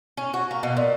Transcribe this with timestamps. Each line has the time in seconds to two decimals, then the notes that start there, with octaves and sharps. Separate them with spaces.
0.17 C#4
0.34 F#4
0.51 A#3
0.63 B2
0.77 A#2